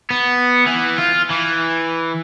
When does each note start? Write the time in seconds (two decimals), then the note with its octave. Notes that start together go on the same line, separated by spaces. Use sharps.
0.11 B3
0.66 E3
0.98 F4
1.30 E3